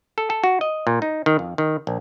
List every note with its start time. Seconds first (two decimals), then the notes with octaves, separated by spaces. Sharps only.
0.18 A4
0.30 A4
0.44 F#4
0.61 D#5
0.87 A#2
1.02 D#4
1.26 D#3
1.39 F2
1.58 D#3
1.87 A#1